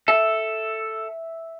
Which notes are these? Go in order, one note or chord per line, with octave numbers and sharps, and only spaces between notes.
A4 E5